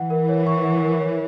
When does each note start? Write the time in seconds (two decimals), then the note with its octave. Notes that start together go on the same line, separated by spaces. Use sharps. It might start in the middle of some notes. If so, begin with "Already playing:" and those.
Already playing: E3 F#5
0.10 A#4
0.29 C#5
0.47 C#6
0.65 F#5
0.83 A#4
1.00 C#5